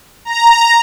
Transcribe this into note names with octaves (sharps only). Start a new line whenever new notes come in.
A#5